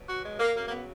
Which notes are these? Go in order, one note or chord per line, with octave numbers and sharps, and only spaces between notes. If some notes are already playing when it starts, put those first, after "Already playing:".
Already playing: B2 F#3
F#4
G#3
A#3
C#3 F#3 A#3
A#3
B3